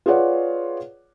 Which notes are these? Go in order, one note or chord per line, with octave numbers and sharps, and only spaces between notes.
F4 G#4 B4 C#5 D5 F#5